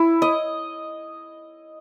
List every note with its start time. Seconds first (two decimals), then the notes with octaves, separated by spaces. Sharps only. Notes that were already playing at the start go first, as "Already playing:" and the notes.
Already playing: E4
0.22 D#5